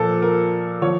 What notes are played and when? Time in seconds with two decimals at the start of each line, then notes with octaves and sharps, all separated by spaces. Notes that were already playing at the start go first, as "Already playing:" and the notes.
Already playing: A#2 F3 A4
0.22 A#4
0.82 F3 C#5